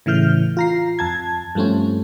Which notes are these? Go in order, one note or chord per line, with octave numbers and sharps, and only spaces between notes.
A2 C#3 E3 F6 G6
F4 A#5 C7
F2 A5 G#6
G2 F3 A3 C4 C#4